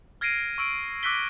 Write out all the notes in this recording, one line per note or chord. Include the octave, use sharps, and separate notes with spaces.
F6 G#6 A#6 C7 D7 D#7
C#6 E6 D7
D6 E6 F#6 A#6 B6 G7